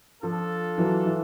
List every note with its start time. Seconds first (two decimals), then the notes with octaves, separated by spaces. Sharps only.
0.23 F3 D4 F4 A4
0.78 E3 F#3
1.06 E3